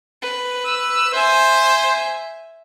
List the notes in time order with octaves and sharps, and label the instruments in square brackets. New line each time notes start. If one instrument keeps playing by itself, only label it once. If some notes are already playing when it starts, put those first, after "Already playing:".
[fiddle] B4
[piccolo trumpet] E6
[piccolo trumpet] C5 [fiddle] E5 G#5